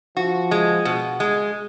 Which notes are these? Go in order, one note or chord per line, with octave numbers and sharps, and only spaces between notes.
F3 F#4
G#3
B2
G#3